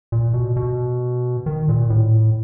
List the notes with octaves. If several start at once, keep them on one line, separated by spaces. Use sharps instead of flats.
A#2
B2
B2
D#3
A#2
A2